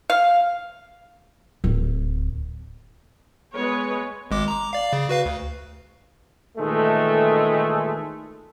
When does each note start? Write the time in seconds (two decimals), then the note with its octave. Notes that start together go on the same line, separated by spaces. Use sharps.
0.10 F5
1.64 D1
3.54 G#3 B3 B4 C#5
4.31 G#1 G#3 D6
4.48 A#5 D6
4.73 D5 F5
4.93 C#3
5.09 F#4 B4 F5
5.25 D2
6.58 A#2 D#3 E3 G#3 A3